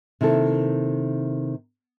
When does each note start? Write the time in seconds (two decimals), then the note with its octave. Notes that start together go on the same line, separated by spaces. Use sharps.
0.21 C3 D#3 A#3 E4 A4